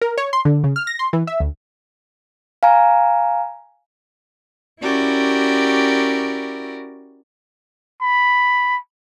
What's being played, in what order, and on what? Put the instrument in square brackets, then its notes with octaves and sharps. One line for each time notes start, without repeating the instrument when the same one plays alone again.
[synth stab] A#4
C#5
C6
D3
C#3
F6
A#6
C6
E3
E5
D2
[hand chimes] F5 G#5 A#5
[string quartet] C#4 E4 F#4 G4 A#4 D5
[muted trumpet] B5